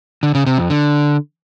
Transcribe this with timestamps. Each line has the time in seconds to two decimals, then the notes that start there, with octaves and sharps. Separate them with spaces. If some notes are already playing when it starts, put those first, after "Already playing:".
0.23 D3
0.35 C#3
0.46 C3
0.58 F2
0.70 D3